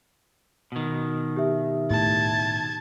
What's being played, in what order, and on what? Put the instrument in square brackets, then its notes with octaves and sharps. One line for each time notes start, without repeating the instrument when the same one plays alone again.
[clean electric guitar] B2 D#3
[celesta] G4 E5
[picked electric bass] A2 [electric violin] A5 G#6